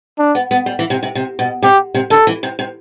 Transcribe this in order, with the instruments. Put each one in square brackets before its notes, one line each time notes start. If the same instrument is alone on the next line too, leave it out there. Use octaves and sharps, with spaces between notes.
[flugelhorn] D4
[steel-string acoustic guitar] B3
B3
G3
E3
C3
C3
C3
B2
[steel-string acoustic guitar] C3 [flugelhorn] G4
[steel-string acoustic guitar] C3
[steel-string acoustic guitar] D3 [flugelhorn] A4
[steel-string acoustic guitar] E3
C3
C3